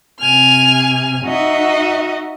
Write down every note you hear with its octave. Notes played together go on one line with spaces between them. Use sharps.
C3 G#5 F6
D#4 F#4 D#5 E5